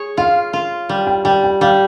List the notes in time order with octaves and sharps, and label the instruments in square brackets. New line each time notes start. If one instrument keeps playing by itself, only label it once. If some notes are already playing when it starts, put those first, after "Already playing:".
Already playing: [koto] G#4 C#5
[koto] F4 [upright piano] F5
[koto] F4
G3
[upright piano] G5
[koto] G3 [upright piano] G5
[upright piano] G5
[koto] G3 [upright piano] F5